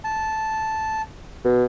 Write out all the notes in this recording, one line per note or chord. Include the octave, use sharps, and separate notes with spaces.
A5
B2